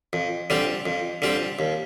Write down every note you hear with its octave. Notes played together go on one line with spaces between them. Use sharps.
F2
D3 G3 C4 F4
F2
D3 G3 C4 F4
D#2